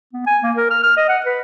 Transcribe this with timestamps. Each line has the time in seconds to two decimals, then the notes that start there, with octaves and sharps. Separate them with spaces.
0.13 B3
0.26 G#5
0.43 A#3
0.56 A#4
0.70 F6
0.83 F6
0.97 D#5
1.09 F#5
1.25 B4